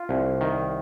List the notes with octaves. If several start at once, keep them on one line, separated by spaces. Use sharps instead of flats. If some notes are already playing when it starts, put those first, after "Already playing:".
Already playing: F4
C2
D#3